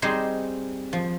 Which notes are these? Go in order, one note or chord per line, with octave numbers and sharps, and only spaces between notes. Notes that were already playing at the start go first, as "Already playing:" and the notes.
G3 C4 D#4 G#4 C5
F3